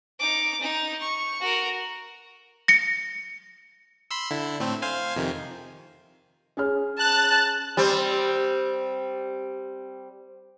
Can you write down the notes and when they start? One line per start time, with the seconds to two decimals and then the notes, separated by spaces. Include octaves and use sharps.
0.19 D#4 D6
0.60 D#4
1.01 C#6
1.41 F#4 A#4
2.68 A#6 C#7
4.11 B5 C6 E6
4.31 D3 E4
4.60 A2 A3 C4
4.82 C5 F5 G#5
5.16 F2 C3 D#3
6.57 C#4 G#4 F6
6.99 A5 F#6
7.77 G3 C4